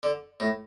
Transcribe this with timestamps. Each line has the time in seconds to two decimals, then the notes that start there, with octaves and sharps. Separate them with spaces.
0.03 D3
0.40 A2